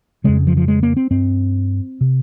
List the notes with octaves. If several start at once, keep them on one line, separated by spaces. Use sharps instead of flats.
F2 C#3 G#3
F3
F3
G#3
A#3
C4
G2 C4
C3